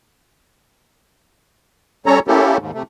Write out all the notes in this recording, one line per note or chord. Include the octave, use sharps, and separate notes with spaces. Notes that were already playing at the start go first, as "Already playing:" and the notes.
G3 C#4 A4 C#5 A#5
A3 A#3 C#4 E4 G4 A4
D#2 G#2
C3 A3